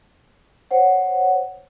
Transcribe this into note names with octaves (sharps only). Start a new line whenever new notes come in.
C5 C#5 F#5